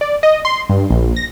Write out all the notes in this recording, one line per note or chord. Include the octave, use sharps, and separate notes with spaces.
D5
D#5
C6
G2
A#1
A#6